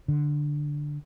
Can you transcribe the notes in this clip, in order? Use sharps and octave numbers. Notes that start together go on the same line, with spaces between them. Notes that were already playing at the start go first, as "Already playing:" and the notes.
D3